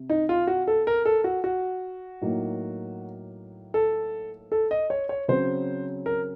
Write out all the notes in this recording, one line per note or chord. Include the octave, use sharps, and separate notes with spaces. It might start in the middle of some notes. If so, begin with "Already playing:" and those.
Already playing: C3
D#4
F4
F#4
A4
A#4
A4
F#4
F#4
A2 F#3 A#3 D#4
A4
A4
D#5
C#5
C#5
C#3 F#3 C4 C5
A#4